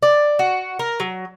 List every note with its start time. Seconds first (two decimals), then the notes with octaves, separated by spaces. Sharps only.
0.03 D5
0.39 F#4
0.79 A#4
1.00 F#3